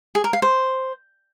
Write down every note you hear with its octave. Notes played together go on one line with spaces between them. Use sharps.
G#4
A#4
F5
C5